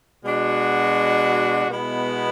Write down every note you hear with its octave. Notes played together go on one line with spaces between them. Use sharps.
B2 G#3 D4 F#4
B2 G#3 B3 E4